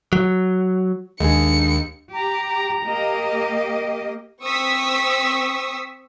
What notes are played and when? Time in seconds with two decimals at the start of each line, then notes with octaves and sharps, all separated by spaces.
0.13 F#3
1.20 D#2 G#3 D4 G#4 C#7
2.13 G4 A#5
2.86 A#3 G4 D#5
4.43 C4 C#6 D#6 E6 B6